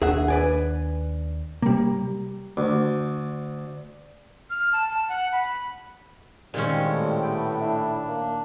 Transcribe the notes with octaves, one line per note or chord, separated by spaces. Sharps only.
D#2 D4 G#4 E5 F#5
B4 D5 G#5
C3 G3 A#3
D2
F6
A5
A5
F#5
B5
A#2 D#3 G3 G#3 C4 C#4
A2
A3 B3 G5
D4 E4
A#3